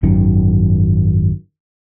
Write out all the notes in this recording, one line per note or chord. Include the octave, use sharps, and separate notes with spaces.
G#1 F#2 D#3